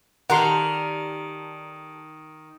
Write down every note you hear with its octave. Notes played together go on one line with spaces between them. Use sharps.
D#3 G4 A4 A#4 D5 F#5 C6